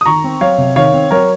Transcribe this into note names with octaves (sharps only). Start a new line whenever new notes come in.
D#6
D#3 A#5 C#6
C4
F#3 C#5 F5
C3
D#3 C#5 F5
C4
F#3 A#4 C#5